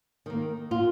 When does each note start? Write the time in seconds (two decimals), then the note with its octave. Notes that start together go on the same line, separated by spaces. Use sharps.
0.26 D#3 A#3
0.71 A#2 F4